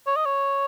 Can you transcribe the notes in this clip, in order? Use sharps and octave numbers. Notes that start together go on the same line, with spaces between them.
C#5
D#5
C#5